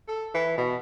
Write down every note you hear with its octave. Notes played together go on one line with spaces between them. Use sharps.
A4
E3
B2